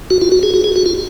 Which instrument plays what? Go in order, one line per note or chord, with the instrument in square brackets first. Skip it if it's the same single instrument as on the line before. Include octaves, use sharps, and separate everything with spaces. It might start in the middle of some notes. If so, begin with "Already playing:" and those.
[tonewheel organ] F#4
F4
F#4
G#4
F#4
G#4
F#4
F4